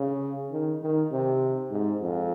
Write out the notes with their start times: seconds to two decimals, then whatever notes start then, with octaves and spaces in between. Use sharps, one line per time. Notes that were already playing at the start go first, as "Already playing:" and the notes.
Already playing: C#3
0.51 D#3
0.81 D#3
1.11 C3
1.71 G#2
2.02 F2